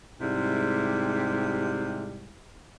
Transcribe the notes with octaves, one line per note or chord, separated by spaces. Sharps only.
G#2 C3 G3 G#3 E4